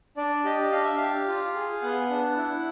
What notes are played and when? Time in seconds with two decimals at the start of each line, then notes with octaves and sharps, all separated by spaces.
0.17 D4 D5
0.44 G4 D#5
0.72 D4 F5
0.84 E5
0.97 G4 F5
1.28 F4
1.55 G#4
1.82 B3 F#5
2.10 D4
2.37 E4